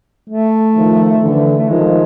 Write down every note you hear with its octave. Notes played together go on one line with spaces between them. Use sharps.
A3
D#3 F3
D3 E3
A3
D#3 F3 G#3